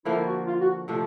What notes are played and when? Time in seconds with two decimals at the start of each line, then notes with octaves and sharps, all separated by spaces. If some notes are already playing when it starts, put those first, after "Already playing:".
0.05 D3 F3 A#3 E4
0.26 F#4
0.47 F4
0.60 F#4
0.88 C3 F3 A3 D4